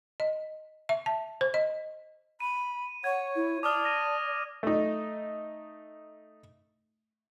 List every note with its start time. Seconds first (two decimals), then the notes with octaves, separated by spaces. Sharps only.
0.20 D#5
0.89 E5
1.06 A5
1.41 C5
1.54 D#5
2.40 B5 D#7
3.04 C#5 F#5 G#6
3.36 E4
3.63 D5 A5 D6 D#6 F6
3.85 A#6 D#7
4.63 A3 D#4